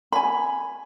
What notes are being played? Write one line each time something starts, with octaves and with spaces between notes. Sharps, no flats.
G#5 B5